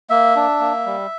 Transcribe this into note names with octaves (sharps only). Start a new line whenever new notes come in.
A#3 E5
D4
A#3
G3